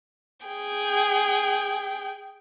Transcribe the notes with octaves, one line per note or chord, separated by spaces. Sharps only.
G#4 G5